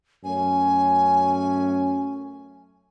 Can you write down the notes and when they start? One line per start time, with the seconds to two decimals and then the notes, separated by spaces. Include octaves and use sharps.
0.24 F#2 A3 C#4 G#5